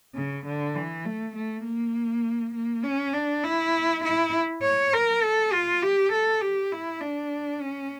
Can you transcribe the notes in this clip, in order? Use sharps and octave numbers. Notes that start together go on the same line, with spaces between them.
C#3
D3
E3
A3
A3
A#3
A#3
C#4
D4
E4
E4
C#5
A#4
A4
F4
G4
A4
G4
E4
D4
C#4